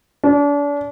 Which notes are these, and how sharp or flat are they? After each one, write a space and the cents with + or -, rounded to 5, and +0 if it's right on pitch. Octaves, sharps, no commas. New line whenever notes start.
D4 -35